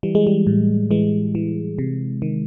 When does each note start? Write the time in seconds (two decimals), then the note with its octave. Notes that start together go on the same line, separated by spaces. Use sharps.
0.03 E3 G3
0.15 G#3
0.27 G3
0.47 A2
0.91 E3 G#3
1.35 E3
1.78 C3
2.22 D#3